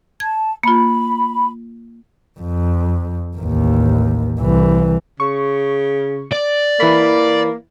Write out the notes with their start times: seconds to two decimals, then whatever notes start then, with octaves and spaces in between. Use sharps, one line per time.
0.20 A5 G#6
0.63 A#3 F4 B5
2.40 F2
3.36 A1 D#2
4.40 C2 E3
5.20 C#3 C#6
6.32 D5
6.80 E3 A#3 B5